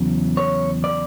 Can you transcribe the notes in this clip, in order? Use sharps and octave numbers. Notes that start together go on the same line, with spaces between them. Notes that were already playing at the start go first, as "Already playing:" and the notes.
Already playing: E2 C#3 F#3
C#5
D5